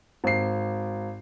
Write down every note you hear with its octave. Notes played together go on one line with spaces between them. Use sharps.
G#1 C7